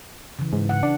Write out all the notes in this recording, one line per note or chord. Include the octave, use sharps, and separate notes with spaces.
C#3 E3
G#2
C#3 F#5
D4